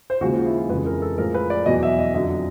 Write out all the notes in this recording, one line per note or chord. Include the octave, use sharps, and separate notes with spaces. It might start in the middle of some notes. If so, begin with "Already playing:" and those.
C5
D#2 C#3 F3 G#3 F#4
F4
E4
F4
F2 C#3 E3 G#3 B4
A#4
A4
A2 F3 G#3 A#4
B4
D5
E2 B2 F#3 D#5
E5
D#5
F2 D3 F#3 D#5